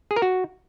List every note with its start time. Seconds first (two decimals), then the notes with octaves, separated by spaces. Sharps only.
0.11 G#4
0.16 A#4
0.22 F#4